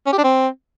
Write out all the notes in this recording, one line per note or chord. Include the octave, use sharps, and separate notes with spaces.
C#4
G4
D4
C4